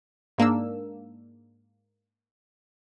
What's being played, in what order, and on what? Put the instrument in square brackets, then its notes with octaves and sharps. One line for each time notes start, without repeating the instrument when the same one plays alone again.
[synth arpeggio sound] G#2 A#3 D4 E6